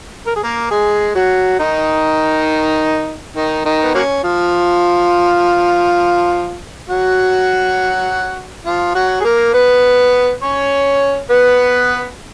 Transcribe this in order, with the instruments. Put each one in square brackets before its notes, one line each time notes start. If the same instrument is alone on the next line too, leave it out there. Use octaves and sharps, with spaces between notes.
[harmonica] A#4
G#4
A#3 A#4
G#3 G#4
F#3 F#4
D#3 D#4
D#3 D#4
D#3 D#4
B3
F#3 A#3 C#4
F3 F4
F#3 F#4
F3 F4
F#3 F#4
G#4
A#3 A#4
B3 B4
C#4 C#5
B3 B4